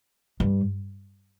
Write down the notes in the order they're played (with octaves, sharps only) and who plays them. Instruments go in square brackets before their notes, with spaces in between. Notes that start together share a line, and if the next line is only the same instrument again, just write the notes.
[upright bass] G2